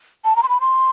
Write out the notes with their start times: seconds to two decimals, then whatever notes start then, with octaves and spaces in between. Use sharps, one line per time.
0.25 A5
0.36 A#5
0.43 C6
0.49 B5
0.61 C6